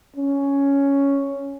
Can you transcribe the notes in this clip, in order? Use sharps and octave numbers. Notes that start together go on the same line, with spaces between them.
C#4